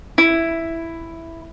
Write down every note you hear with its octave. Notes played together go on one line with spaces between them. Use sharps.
E4